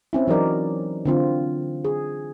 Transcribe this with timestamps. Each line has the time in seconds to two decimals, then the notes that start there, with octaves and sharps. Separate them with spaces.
0.13 C4 C#4 E4
0.27 E3 F#3 D#4 A#4 D5
1.05 D3 C4 F4
1.84 G#4